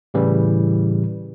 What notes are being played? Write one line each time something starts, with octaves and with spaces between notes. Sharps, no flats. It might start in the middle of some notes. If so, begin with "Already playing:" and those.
A2 C#3 E3 G3